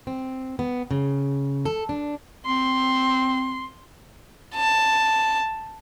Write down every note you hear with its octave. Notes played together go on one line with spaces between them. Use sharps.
C4
B3
C#3
A4
D4
C4 C6
A5